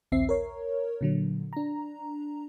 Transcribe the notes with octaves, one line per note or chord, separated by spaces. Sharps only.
A#1 D#2 C4 E5 C7
A#4 C#5
A#2 D3 F#3
D4 A#5